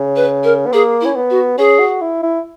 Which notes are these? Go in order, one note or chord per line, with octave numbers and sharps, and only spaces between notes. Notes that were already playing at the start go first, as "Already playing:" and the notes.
Already playing: C#3
B4
A#4
B3
A#3 G#4
E4
C#4
B3
F#4
C#4 G#4
F#4
E4
E4